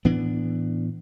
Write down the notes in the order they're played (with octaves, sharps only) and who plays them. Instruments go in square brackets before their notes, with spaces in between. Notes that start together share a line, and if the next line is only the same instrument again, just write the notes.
[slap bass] A2 E3 B3 D4